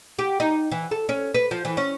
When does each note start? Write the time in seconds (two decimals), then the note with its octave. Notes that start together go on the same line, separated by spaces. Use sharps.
0.19 G4
0.40 D#4
0.71 E3
0.91 A4
1.09 C#4
1.34 B4
1.51 F3
1.65 E3
1.77 C#4